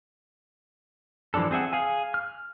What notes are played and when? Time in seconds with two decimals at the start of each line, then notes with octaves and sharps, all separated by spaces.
1.34 E3 F3 G3 D4 A4
1.51 C4 G#4 E5 F#5
1.73 G#4 F5 G#5
2.14 F6